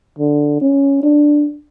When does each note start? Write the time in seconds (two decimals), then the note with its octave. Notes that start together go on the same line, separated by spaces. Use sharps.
0.18 D3
0.61 C#4
1.03 D4